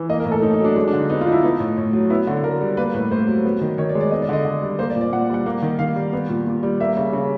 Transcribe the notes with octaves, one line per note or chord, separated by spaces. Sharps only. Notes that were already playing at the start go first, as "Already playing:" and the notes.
Already playing: E3
A#3 D#5
A#4
A2
A4
A2 D#4
D#4
F#3 D4
G#3 D4
D4
D3
D#4
B3 D#4
F4
F3 D#4
E4
B3 D#4
A2
A2
F#3
B3 E4
D3 F#4
D3 A#4
G3
A#3 B4
A2 B4
A2 C5
F#3
B3
D#3
D#3 C#5
D5
G#3
D5
B3 D#5
D5
D3 D#5
D3
G3
A#3 C5
D5
A#2
D5
A#2 F#5
G3 F#5
A#3
D#3
D#3 F5
G3
B3
A#2
A#2
G3
A#3 E5
C#3
C#3